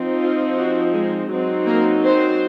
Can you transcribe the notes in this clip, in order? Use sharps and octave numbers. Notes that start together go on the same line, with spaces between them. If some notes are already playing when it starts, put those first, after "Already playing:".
Already playing: F3 C4 D#4
F4
F#4
G#3 G#4
F#3 C4 D#4
A#3 A#4
C4 C5